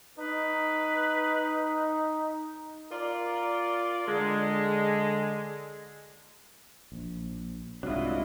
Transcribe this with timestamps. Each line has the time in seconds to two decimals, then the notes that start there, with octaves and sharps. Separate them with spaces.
0.19 D#4 B4
2.92 F4 A#4 D5
4.08 D3 G#3
6.92 A#1
7.83 C2 G#2 F#3 D4 E4 F4 D#5